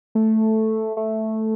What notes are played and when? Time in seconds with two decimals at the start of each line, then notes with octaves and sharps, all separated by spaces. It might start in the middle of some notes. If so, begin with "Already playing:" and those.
0.15 A3
0.97 A3